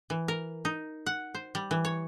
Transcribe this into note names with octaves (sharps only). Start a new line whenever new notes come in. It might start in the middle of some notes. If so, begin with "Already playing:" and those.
E3
A#4
D#4
F#5
C5
G3
E3
C#5